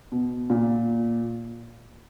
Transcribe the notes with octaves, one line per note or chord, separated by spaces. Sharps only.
B2
A#2